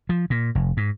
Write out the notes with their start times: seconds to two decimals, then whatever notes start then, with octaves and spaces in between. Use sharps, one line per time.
0.09 F3
0.30 A#2
0.55 F1
0.77 G#2